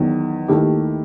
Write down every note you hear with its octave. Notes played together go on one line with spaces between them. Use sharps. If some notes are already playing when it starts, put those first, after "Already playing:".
Already playing: E2 D#3 F#3
D#2 D#3 A3 E4 G4